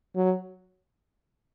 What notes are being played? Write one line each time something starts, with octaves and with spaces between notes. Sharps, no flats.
F#3